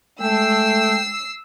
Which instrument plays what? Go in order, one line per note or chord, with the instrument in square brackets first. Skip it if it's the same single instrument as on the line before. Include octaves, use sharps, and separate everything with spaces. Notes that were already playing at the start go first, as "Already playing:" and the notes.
[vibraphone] G#3 A5 [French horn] A3 [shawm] G5 [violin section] E6 C7